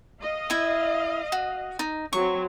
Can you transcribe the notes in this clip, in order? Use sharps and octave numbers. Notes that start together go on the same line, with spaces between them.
D#5 F5
E4 E5
F#4
D#4
F#3 C4 C#6